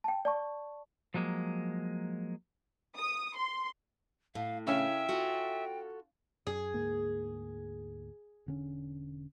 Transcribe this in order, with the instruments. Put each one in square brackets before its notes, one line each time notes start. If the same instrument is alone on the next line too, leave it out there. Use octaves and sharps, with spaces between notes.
[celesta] G5 A5
D5 A5 C#6
[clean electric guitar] F3 F#3 G#3 A#3
[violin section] D#6
C6
[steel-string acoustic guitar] A2 [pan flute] F5
[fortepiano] C#3 C#4 [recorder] E5 [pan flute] G5
[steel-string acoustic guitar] F4 F#4 A4
[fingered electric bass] F#2 [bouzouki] G#4
[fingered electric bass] D2 G#2 A#3
E1 D3 C#4